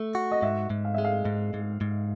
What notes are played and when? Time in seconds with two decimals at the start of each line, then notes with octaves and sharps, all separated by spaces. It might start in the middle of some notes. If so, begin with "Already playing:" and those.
Already playing: A3
0.15 F#4
0.31 D#5
0.42 G#2 E5
0.70 G#2
0.85 F5
0.94 G#3 E5
1.04 F5
1.25 G#2
1.54 G#2
1.81 G#2